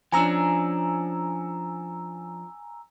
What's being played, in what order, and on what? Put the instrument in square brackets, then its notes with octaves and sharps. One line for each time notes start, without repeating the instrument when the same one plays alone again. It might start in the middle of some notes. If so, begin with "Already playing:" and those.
[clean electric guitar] F3 C#4 D4 [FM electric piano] G#5 A#5 E6